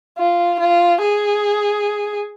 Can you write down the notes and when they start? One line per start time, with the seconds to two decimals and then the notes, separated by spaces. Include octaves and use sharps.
0.18 F4
0.60 F4
1.02 G#4